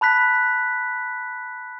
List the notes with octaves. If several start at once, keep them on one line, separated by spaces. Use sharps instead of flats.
A5 B5 F#6 B6